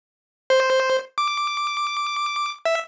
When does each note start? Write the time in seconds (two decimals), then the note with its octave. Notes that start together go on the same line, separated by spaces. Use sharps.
0.50 C5
1.18 D6
2.65 E5